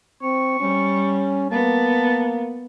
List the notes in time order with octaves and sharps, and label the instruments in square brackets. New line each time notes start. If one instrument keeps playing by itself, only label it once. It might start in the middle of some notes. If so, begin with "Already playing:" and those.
[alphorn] C4 [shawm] C#6
[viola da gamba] G3 [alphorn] C#4
[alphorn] A#3 [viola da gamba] B3 [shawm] A5